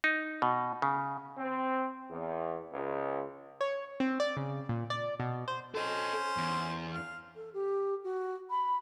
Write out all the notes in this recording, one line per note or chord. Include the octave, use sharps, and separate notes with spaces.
D#4
B2
C#3
C4
E2
C#2
C#5
C4
D5
C#3
A#2
D5
B2
C5
C#4 A4 C5 D#5
E2
F5
A4
G4
F#4
B5